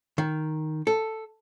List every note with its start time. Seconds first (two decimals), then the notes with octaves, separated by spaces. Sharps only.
0.18 D#3
0.87 A4